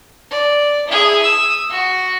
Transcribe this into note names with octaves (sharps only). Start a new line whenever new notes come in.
D5
E4 G#4
D#6 E6
F#4